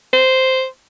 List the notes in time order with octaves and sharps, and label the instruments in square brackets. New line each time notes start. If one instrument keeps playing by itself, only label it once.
[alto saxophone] C5